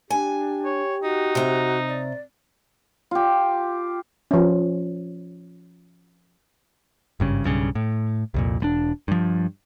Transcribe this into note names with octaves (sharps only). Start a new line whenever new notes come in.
D4 G4 G#5
C#5
D#4 F#4
C3 A#5
D5
F4 G4
F3 C#4
G#1 G2 C#3
B1 G2 C#3
A2
C2 F2 A#2
E1 G#3 D4
G2 F3